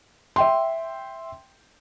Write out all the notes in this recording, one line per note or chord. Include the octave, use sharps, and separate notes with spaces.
E5 G5 C6